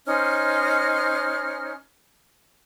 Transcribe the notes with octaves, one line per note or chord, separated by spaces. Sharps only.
C#4 D#4 C5 F6